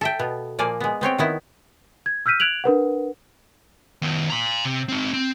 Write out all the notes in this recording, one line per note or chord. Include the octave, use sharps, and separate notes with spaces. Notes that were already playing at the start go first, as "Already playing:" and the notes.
A4 E5 G5
B2 B3
A#2 F3 A#3 D5 G#5
G#3 B3
B3 C4 C#5 G5
D#3 B3 E4
G#6
E6 F6 G6 B6 D#7
F#6 G#6 D7 F7 F#7
D4 A#4 B4 F#5
D#3 B3
A#5 C6
C3
C4 D#4
C4